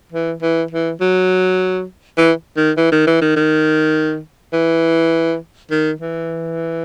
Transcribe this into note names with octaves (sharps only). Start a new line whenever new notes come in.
E3
E3
E3
F#3
E3
D#3
E3
D#3
E3
D#3
D#3
E3
D#3
E3